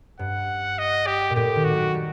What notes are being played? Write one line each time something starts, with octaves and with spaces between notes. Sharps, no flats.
G2 F#5
D#5
G4
A#2
A2 G4
D#3
F#4
F#3
G3